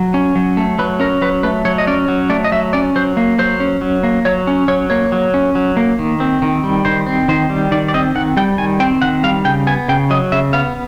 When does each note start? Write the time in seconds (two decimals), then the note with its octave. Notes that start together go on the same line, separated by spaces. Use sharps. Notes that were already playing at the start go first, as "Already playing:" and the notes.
Already playing: F#3
0.14 C#4
0.35 F#3
0.57 A3
0.79 F#3 B4
1.00 C#4 A#4
1.22 F#3 B4
1.43 A3 B4
1.65 F#3 C#5
1.78 D#5
1.87 C#4 D5
2.08 F#3
2.30 A3 D5
2.44 D#5
2.52 F#3 E5
2.73 C#4 D5
2.96 F#3 C5
3.17 A#3
3.39 F#3 C5
3.60 C#4
3.81 F#3
4.03 A#3
4.25 F#3 C#5
4.47 C#4
4.68 F#3 C#5
4.90 A#3 C#5
5.12 F#3
5.34 C#4
5.55 F#3
5.77 A#3
5.99 D#3
6.20 C4
6.42 D#3
6.64 G3
6.85 D#3 C5
7.06 C4
7.28 D#3 C5
7.50 G3
7.72 D#3 D5
7.88 D5
7.94 C4 D#5
8.15 D#3 F#5
8.37 G3 G5
8.58 D#3 G#5
8.80 C4 G5
9.02 D#3 F#5
9.23 G3 F5
9.45 C#3 G5
9.67 B3 G#5
9.88 C#3 G5
10.10 F#3 D#5
10.32 C#3 E5
10.53 B3 F5